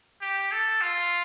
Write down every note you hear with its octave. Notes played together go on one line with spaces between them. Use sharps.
G4
A4
F4